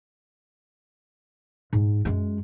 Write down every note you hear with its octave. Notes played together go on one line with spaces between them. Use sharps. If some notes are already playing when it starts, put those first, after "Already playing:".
G#2
F#2 G#3